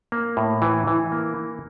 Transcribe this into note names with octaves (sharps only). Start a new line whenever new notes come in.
A#3
A2
E3
E3
A#3